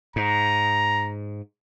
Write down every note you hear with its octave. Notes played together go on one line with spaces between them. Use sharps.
G#2 A#5